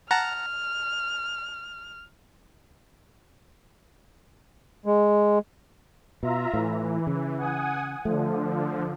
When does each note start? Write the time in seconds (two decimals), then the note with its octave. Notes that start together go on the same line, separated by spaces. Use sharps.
0.11 F#5 A5 A#5 F6
4.86 G#3
6.23 B2 F4 E5 A#5
6.54 A2 E3
7.07 C#3
7.38 F#5 G#5 D#6
8.05 D3 F3 A3